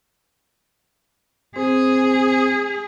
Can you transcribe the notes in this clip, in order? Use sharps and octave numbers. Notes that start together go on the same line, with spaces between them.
C4 G#4 C5